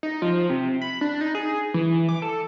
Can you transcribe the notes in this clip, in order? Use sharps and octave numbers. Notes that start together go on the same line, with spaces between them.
D#4
F3
C3
B5
D4
D#4
G#4
E3
D6
A4